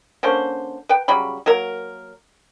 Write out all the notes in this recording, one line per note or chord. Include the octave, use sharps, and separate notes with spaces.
D3 A#3 C#4 C5
B4 G5
C#3 F#3 G3 B5
F#3 A#3 A#4